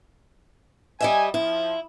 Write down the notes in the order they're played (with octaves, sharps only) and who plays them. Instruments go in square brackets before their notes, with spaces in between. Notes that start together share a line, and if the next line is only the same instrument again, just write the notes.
[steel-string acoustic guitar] G3 D#5 E5 [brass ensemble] G#5
[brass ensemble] F3 [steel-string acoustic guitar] E4